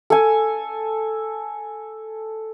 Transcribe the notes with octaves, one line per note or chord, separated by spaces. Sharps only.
A4 G#5